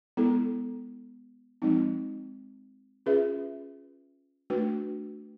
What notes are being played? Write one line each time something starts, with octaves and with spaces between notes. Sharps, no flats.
G#3 B3 E4 A4
F3 G#3 C4 D#4
C#4 F4 G#4 B4 E5
A3 D4 F#4 B4